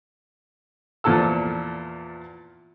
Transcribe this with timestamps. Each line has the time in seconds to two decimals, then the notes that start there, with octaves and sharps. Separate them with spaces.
1.04 E2 A#2 F3 A4 E6